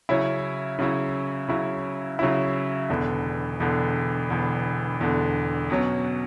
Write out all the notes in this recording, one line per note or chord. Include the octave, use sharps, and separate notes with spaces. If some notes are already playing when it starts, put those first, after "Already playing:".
C#3 F#3 C#4 E4
C#3 F#3 C#4 E4
C#3 F#3 C#4 E4
C#3 F#3 C#4 E4
E1 E2 D3
E1 E2 D3
E1 E2 D3
E1 E2 D3
B2 F#3 C#4